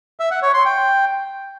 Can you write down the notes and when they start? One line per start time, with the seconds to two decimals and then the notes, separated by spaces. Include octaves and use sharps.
0.20 E5
0.31 F#5
0.42 C#5
0.54 C6
0.65 G5